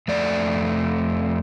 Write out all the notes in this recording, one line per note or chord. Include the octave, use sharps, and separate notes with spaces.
F2 A3 D5